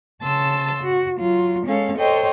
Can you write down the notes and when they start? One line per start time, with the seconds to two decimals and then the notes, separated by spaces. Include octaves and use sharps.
0.22 C#3 A5 C6 E6 A6
0.84 F#4
1.18 F#3 F4
1.66 G#3 C#4 A4 F5
1.98 A4 C5 C#5 D#5 G5